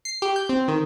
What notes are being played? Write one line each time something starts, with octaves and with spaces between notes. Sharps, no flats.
C7
G4
G6
C4
D#3